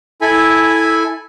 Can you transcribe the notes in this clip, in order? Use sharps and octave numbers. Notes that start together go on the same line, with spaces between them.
E4 A4 G#5 B5